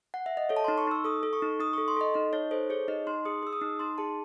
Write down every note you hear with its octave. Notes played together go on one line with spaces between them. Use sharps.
F#5
E5
D#5
A4 C#5
A5
D#4 C6
C#6
D#4 E6
A4 D#6
A4
C#6
D#4
D#4 D#6
A4 C#6
C6
A4 D#5
D#4 D#5
D#4 C#5
A4 C5
G#4 C#5
D#4 D#5
D#4 C6
G#4 D#6
G#4 E6
D#6
D#4
D#4 C6
G#4 A5